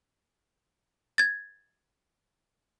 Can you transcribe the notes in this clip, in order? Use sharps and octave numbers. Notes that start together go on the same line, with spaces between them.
G#6 A6